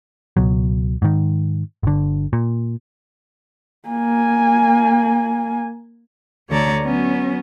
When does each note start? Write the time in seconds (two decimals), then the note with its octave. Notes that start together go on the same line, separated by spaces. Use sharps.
0.37 C#2 B2 F#3
1.02 G#2 D#3
1.83 G1 D3
2.33 A#2
3.88 A#3 G#5
6.49 D2 D3 A4 C#5 D5 A#5
6.82 F#3 B3 C#4